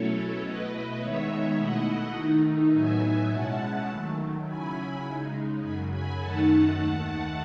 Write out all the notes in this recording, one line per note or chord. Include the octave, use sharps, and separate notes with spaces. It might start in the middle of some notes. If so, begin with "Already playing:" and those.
Already playing: B2 F#3 A3 C#4 E4 A4 C#5
B2 A3 E4 B4 D#5
D#3 G#3 B3 D#4 C#5 E5
B2 A3 E4 D#5 F#5
D#3 A3 D#4
A2 F#3 B3 D#4 E5 G#5
B2 G#3 C#4 E4 F#5 A5
D#3 F#3 A3
C#3 F#3 C#4 E4 G#5 B5
C#3 G#3 D#4
F#2 C#3 F#3 G#5 B5
G#5 B5
F#2 D#3 A3 D#4 F#5 A5
D#2 D#3 A3